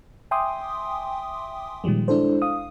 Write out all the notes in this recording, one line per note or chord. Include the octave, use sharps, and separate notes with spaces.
E5 G5 G#5 C6 D6 D#6
A#2 D#3 F3 G3 G#3
G#3 D4 E4 A4 C5
F5 D#6